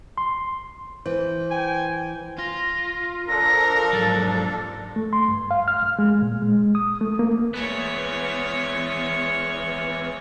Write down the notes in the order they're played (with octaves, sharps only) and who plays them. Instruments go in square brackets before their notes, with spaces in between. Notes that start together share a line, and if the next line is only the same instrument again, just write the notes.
[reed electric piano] C6
[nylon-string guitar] E3 [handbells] C5
[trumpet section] G5 G#5
[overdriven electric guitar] F4 [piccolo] A#6
[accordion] F3 D4 A4 [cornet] A#4 [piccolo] A#6
[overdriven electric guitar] G#2 F#3 [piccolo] A6
[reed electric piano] A3
C6
G2
F5
F6
G2
G#3
A#2
G#3
D#6
A3
A#3
[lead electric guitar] E2 B3 [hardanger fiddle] G#3 C#5